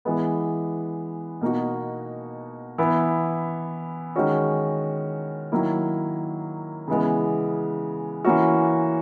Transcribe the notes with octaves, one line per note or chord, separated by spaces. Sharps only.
E3 G#3 B3
B2 A#3 D#4 F#4
E3 B3 E4
D#3 G#3 C#4 F#4
D#3 F#3 A#3 E4
C#3 E3 G#3 B3
E3 A#3 C#4 F#4